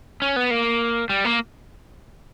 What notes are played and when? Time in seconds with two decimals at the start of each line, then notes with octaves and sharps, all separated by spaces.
0.22 C#4
0.36 B3
0.51 A#3
1.10 G3
1.25 A#3